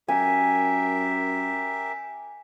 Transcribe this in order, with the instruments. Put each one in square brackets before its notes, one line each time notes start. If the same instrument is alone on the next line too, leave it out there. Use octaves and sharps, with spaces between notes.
[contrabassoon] F#2 [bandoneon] G4 A#4 E5 [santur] G#5